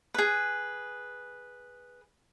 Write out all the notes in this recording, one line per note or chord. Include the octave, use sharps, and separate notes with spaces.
G#4 B4